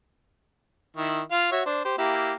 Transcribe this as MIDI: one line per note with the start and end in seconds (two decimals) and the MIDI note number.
0.97 1.21 51
0.97 1.21 64
1.31 1.49 65
1.31 1.49 77
1.52 1.62 66
1.52 1.62 73
1.52 1.62 76
1.66 1.81 62
1.66 1.81 72
1.85 1.95 67
1.85 1.95 72
1.98 2.33 58
1.98 2.33 64
1.98 2.33 67